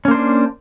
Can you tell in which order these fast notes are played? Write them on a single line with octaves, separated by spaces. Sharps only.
C#4 A#3 C5 D4